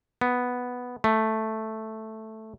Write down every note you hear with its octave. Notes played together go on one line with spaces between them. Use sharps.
B3
A3